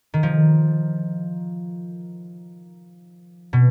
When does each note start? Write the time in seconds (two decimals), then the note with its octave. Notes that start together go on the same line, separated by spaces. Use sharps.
0.14 D#3
0.23 F3
3.53 B2